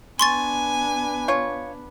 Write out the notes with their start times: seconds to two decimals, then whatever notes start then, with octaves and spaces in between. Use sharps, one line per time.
0.19 B3 D4 G#5 C6 C#6 A6
1.28 F4 C#5